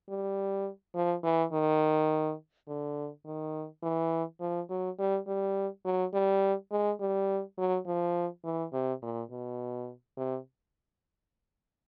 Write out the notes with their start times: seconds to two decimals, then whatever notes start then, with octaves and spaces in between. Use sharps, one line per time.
0.09 G3
0.95 F3
1.24 E3
1.52 D#3
2.68 D3
3.25 D#3
3.83 E3
4.41 F3
4.70 F#3
4.98 G3
5.27 G3
5.85 F#3
6.14 G3
6.71 G#3
7.00 G3
7.58 F#3
7.86 F3
8.44 E3
8.73 C3
9.02 A#2
9.31 B2
10.17 C3